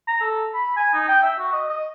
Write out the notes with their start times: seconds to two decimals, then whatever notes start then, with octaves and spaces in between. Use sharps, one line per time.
0.07 A#5
0.21 A4
0.54 B5
0.77 G#5
0.94 D#4
1.08 G5
1.22 E5
1.39 F#4
1.53 D#5
1.69 D#5